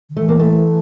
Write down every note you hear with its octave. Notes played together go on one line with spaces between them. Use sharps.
D3
E3 A3
A#3
A3